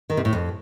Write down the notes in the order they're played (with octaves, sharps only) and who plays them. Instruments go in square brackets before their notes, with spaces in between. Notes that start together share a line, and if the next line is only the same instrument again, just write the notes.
[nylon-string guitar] D#3
C3
A2
F2